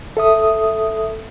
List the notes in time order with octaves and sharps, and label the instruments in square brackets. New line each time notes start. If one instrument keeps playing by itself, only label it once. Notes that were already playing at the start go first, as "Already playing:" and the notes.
[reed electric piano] A4 E5 D#6